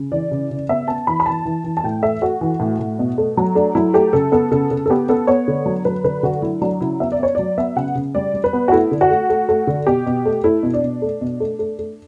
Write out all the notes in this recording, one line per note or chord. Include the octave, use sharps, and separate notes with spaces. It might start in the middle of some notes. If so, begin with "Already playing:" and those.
Already playing: C#3
E3 D5
C#3
C#3
B3 E5
B3 A5
E3 B5
B5
E3 A5
E3
E3
A5
A2 G5
A3 E5
A3 F#4
E3
A2
A2
B2
A3
F#3
A3 D4
F#3 E4
A3 G4
C#3 A4
B3 A4
C#3 A4
C#3 A4
A4
B3 G4
B3 A4
B3 C#5
D3
F#3
F#3 B4
D3 B4
D3 F#4
F#3 E4
F#3 D4
C#3 E4
B3 E5
D5
B3 C#5
F#3 D5
B3 E5
C#3 F#5
C#3
G3 D5
G3
B4
B3
F#4
A3 E4
D3
F#4
A3
A3
A3
D3
B2 G4
B2
A3
A3 E4
B2
D4
B2
A3
B2
A3
A3
A3